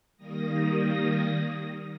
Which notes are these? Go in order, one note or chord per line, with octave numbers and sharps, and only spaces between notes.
D#3 G3 A#3 D#6 A#6